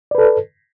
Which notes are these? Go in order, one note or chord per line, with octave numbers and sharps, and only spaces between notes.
A4 B4 D5